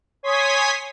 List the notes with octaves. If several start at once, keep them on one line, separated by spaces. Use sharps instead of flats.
C#5 G#5 C6 D#6 G#6 B6